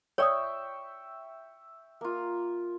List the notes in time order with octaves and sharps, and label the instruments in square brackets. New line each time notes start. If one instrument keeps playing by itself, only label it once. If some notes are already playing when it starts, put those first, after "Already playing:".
[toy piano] C#5 D5 D#6 [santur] E5 G5 C#6
[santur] A#3 F4